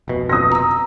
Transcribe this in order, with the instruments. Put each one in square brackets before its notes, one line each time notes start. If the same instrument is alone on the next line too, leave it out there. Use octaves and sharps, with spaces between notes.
[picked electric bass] F1 B2
[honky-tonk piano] D#6 A#6
[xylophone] A#5 E6